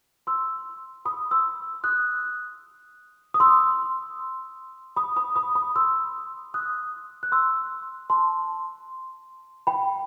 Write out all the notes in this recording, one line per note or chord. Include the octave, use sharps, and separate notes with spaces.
C6 E6
B5 D#6
C6 E6
D#6 F#6
D#6
C6 E6
B5 D#6
B5 D#6
B5 D#6
B5 D#6
C6 E6
D#6 F#6
F#6
C6 E6
A5 C6
G5 B5